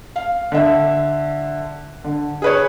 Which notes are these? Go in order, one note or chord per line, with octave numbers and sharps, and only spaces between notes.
F5
D3 E5
D3
G#4 B4 C#5